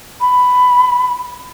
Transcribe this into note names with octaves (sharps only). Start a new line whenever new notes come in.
B5